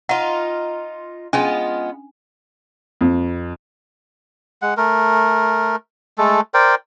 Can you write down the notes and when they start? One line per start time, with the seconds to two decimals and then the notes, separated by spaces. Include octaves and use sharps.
0.09 D#4 F4 F#5
1.33 G#3 B3 C#4 D4 F4 G#5
3.01 F2
4.62 G#3 F#5
4.77 A3 A#4
6.18 G#3 A3 A4
6.54 A#4 C5 D5 G5